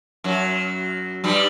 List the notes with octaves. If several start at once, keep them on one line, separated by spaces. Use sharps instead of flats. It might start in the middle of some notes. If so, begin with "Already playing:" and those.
F#2 F#3
G2 G3